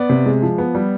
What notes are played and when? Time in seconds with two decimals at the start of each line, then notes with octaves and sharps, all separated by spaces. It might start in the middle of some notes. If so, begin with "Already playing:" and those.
Already playing: B3 D5
0.09 C3
0.25 G#3
0.42 F3
0.58 B3
0.75 G3